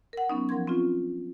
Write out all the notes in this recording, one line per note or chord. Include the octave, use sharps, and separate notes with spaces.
A#4 F#5
F#3 B3 C#4 D#4
F3 A#4 F#5 C6 G#6
C4 C#4 F4